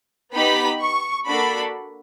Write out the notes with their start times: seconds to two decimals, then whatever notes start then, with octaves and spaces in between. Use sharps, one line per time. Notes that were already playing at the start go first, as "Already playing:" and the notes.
0.33 B3 D#4 G4 B5
0.80 C#6
1.27 A#3 D4 F#4 A4 B5